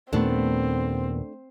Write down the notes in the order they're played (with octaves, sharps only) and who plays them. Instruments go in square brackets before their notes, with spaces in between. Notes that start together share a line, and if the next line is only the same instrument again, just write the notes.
[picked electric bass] D#2 A#2 B3 [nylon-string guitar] A3 D4 [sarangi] C4